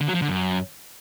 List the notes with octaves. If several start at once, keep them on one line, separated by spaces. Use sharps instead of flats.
D3
F#3
F3
D3
F#2